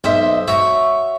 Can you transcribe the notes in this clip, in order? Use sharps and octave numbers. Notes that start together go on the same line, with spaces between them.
B1 C5 D#5 E5
F#4 C#5 E5